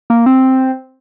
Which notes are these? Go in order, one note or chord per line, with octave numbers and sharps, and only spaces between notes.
A#3
C4